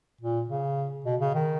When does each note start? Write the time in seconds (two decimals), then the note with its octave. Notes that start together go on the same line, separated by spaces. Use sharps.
0.21 A#2
0.49 C#3
1.05 B2
1.20 C#3
1.35 D#3